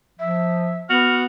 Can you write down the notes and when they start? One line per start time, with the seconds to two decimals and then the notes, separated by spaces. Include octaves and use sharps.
0.20 F3 E5
0.90 B3 F#4 F6